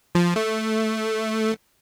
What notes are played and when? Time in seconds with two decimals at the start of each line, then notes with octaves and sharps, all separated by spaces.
0.15 F3
0.36 A3